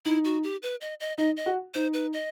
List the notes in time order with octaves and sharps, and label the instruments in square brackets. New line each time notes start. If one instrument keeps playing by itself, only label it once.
[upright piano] D#4 [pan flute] E4
[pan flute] F#4
G4
B4
D#5
D#5
[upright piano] D#4 [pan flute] D#5
[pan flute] D#5
[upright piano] F#4
[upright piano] D#4 [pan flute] C5
[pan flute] B4
D#5